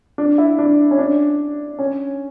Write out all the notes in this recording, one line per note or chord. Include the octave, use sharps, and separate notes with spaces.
D4
E4
D4
C#4
D4
C#4